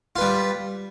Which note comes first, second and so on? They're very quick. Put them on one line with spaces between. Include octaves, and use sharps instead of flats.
F4 B4 G3